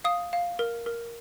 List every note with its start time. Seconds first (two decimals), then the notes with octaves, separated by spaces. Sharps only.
0.04 F5 D#6
0.33 F5
0.59 A#4
0.86 A#4